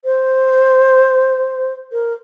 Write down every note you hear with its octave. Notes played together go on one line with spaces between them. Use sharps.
C5
A#4